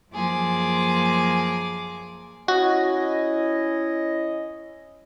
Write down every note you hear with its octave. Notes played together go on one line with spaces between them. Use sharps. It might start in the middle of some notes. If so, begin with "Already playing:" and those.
F#2 F3 A#3 G#4 D6
C#4 E4 F#4 D#5